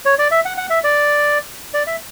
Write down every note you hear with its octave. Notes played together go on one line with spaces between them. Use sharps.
C#5
D5
E5
F#5
F#5
E5
D5
D5
E5